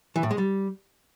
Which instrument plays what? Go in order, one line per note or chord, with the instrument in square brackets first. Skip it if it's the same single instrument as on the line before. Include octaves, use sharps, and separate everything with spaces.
[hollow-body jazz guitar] E3
A2
G#3
G3